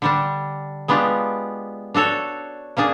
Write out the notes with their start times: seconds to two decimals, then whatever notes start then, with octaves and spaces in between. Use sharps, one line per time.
0.02 D3 G3 D4
0.88 G#3 B3 D4 F4 G4
1.94 D4 F#4 A4 C#5
2.77 A#3 C#4 D4 G#4